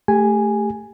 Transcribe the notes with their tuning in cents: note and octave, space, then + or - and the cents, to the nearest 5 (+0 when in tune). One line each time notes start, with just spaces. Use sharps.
A3 +0 G4 +25 G#5 +0